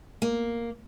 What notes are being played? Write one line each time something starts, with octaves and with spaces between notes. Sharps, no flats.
A#3